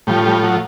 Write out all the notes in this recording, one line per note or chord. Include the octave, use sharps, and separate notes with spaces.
A2 F3 G3
G3
F#3